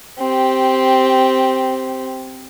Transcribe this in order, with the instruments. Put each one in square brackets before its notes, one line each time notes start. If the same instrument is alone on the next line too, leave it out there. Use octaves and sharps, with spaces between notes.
[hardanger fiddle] C4 G4